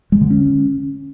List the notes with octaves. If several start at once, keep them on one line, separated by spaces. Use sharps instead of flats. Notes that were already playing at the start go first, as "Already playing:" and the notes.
G#3
D3
C#4